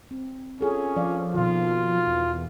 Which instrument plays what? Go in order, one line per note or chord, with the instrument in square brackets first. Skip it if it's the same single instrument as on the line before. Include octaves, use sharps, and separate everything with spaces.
[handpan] C4
[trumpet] C#4 [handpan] F4 G#4 A4
[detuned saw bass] F3 [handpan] D5 F5
[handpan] B2 D#3 [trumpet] F4
[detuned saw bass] E2